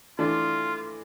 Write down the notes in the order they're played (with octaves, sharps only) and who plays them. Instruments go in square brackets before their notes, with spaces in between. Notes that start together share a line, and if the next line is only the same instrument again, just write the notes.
[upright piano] E3 A3 D4 [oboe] F4